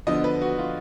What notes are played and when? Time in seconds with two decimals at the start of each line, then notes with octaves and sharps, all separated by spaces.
0.07 D3 F3 B3 D#5
0.24 B4
0.42 F#4
0.58 F4